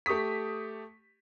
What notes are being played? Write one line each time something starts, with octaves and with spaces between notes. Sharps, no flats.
A3 G4 C#6 D#6 B6